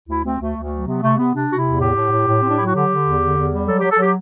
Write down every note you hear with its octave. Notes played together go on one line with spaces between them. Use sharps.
D2 E4
D2 C4
D2 A3
D2
A3
F#3
C3 B3
C3 A3
C3 B3
C3 D4
C3 F#4
E4
E2
A2 G4
A2
A2
A2
A2 C4
D4
F#3 E4
F#4
D3 G4
D3
E2
D3
E2
G3
F#3 A4
F#3 G4
A4
F#3 G4